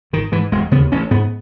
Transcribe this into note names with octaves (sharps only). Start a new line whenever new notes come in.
G#1 D#3
G#2 E3
E1 G#3
D#2 C#3 B3
A1 C#4
G#2 B3